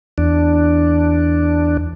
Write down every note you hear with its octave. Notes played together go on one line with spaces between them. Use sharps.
E2 D4